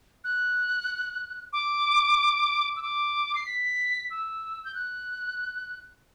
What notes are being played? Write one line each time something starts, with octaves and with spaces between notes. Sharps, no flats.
F#6
D6
E6
D6
C7
B6
E6
G6
F#6